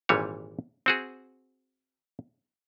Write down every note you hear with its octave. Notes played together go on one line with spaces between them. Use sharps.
G#1 A#2 E3 G3 C#5
C4 F#4 G#4